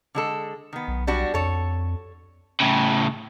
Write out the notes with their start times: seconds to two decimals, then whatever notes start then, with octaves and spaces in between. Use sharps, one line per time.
0.15 D3 G#3 A4
0.73 D#3 B3
0.88 B1
1.07 G3 D4 F#4
1.34 F2 A4 C#5
2.60 A2 C#3